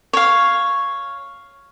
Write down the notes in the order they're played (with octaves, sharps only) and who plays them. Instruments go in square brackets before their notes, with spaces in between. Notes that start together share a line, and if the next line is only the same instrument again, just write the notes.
[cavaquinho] C#5 F5